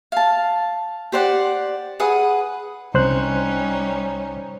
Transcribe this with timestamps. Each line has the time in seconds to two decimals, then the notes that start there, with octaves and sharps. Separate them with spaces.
0.12 F5 A5
1.12 G4 C5 D5 F#5
2.00 G#4 B4 F#5 D#6
2.94 C2 G3 C#4 D#4 C5 F#6